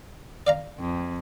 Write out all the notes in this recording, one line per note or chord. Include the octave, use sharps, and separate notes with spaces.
D5 F5 A#5
F2